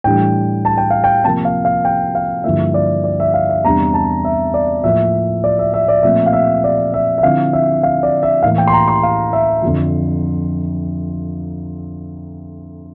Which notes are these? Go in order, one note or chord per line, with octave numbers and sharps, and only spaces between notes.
A2 E3 G3 D4 G5
A5
G5
F5
G5
C3 F3 A#3 A5
F5
F5
G5
F5
G2 D3 F3 A#3 E4 E5
D5
D5
E5
F5
E5
E2 C3 G3 D4 A#5
A5
E5
D5
A2 F3 A#3 E5
D5
E5
E5
D5
A#2 F3 A3 C4 E5
F5
E5
D5
E5
E5
D3 F3 C4 E4 F5
E5
F5
D5
E5
A2 E3 A#3 F5
G5
C6
A#5
C6
F5
E5
F2 D3 F3